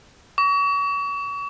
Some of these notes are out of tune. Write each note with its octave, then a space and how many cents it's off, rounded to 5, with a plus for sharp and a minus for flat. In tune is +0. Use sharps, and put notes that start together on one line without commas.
C#6 +40